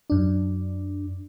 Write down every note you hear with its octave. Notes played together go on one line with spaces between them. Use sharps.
F#2 D4